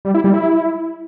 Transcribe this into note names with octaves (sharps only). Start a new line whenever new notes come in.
G3
E4
G3
E4